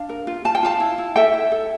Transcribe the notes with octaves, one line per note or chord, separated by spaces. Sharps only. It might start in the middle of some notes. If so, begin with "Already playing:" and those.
Already playing: D4 F5
A#4
F4
F4 A5
G5
F4 F5 A5
E4
E4
A4 E5 G5
E4
A4